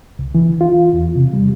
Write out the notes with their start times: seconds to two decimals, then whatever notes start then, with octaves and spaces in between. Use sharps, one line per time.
0.19 C2
0.35 E3
0.61 F4
0.93 E2
1.16 C3
1.33 G3